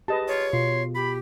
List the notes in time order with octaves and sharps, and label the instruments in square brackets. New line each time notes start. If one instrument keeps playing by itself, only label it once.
[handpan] G4 G#4 [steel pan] B4 D#5 A5
[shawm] F4 [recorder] C#5
[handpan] B2 F4 [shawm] C6
[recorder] G4 [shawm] B5